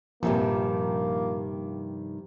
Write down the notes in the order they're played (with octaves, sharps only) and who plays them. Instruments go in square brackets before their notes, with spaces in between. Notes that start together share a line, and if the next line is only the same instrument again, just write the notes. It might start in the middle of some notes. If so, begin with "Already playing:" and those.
[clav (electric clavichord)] A#1 [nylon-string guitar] G2 C3 D#3 [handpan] F3 G4 [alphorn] A#3